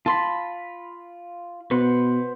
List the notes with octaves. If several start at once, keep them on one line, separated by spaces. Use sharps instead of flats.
F4 A5 B5 C6
B2 B4 C5 F#5